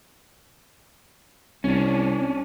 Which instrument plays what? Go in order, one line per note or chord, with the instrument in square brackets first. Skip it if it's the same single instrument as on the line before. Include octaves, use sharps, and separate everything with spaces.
[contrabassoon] C2 [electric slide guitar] C#4 D4